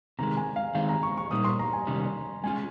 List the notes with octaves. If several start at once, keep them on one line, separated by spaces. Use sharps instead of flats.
C3 D#3 G#3 A#5
G#5
F5
D#3 G#3 C4 D#4 F5
A#5
C#6
C#6
A#2 G3 A#3 D#4 D#6
C6
A#5
G#5
C3 D#3 G3 C#4
G#3 C#4 F4 G#5